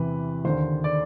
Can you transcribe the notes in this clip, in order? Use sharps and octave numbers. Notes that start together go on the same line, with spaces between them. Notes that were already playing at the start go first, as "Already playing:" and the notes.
Already playing: E2 C3 E3 B4
D#2 D3 C5
D5